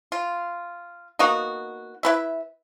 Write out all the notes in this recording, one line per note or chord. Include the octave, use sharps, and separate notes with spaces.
F4
A#3 B3 D#4 F#4
E4 B4 E5